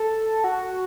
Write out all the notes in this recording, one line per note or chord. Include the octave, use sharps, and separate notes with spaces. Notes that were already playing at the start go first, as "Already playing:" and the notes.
Already playing: A4
F#4